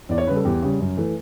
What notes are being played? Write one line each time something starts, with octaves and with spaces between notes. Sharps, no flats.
E2 D5
C#5
C#3 G3 B4
A4
E2 G4
C#3 G3
F#2
E3 A3